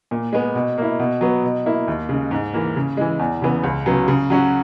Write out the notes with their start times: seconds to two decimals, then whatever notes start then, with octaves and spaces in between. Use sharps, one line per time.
0.11 A#2
0.32 G#3 B3
0.55 B2
0.78 A#3 E4
0.99 B2
1.21 F#3 B3
1.43 B2
1.66 A#3 E4
1.88 D#2
2.09 C#3 G#3
2.31 G#2
2.53 E3 A#3
2.76 C#3
2.97 E3 G#3
3.19 E2
3.42 C#3 E3 B3
3.64 C#2
3.86 C#3 F#3 B3
4.08 C#3
4.30 F#3 C#4 F#4